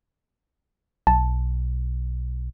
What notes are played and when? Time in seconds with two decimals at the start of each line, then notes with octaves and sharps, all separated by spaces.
1.07 B1 A5